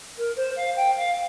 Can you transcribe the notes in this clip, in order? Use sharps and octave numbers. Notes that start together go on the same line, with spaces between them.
A#4
C5
F5
G5
F5